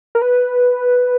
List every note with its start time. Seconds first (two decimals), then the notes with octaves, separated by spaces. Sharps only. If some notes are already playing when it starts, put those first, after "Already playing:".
0.15 A#4
0.22 B4